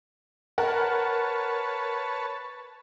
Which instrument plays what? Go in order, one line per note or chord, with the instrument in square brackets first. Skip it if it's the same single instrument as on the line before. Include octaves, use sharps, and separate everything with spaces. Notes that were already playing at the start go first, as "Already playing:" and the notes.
[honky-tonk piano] A#4 F#5 [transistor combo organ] B4 C#5 A5